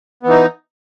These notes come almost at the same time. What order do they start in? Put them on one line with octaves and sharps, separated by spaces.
B3 E3 D#4